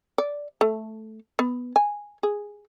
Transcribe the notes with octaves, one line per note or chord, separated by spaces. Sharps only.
D5
A3
B3
G#5
G#4